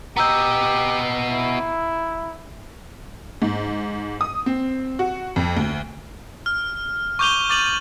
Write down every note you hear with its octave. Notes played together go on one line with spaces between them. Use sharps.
B3 G4 D#5 A#5 E6 G6
E4
G#2
D#6
C4
F#4
F2
D2
F6
C#6 D6 G6 D#7 F7 G7
C#6 D6 A6 D#7 F7 F#7